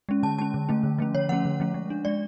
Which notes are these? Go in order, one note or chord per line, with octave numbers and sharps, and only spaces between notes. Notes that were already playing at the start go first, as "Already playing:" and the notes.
G#3 C#4
D3 A5
G#3 C#4 A5
D3
F3 A3 C#4
D3
F3 A3 C#4
D3 C#5
F3 A3 C#4 F#5
D3
F3 A3 C#4
G#3
D4
G#3 D5